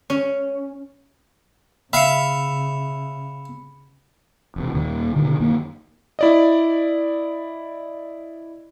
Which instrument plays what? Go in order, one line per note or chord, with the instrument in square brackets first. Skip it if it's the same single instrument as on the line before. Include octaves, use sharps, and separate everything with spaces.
[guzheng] C#4
[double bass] C#3 [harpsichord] E5 F5 [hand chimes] B5 C#7
[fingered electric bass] E1 C3
D#2 A#2 D#3 G3
B2 D3 D#3
F#2 D#3 A#3
[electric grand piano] E4 D5 D#5